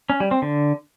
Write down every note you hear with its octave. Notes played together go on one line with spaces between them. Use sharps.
C#4
G3
C4
D3